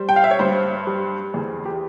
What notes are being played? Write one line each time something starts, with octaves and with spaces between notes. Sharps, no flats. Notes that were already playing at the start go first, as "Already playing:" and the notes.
Already playing: G3 C5
G5
F5
E5
C#5
G2 C5
G3
E2 G#4
G4